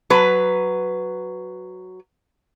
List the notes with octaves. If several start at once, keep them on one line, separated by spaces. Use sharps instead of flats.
F#3 B4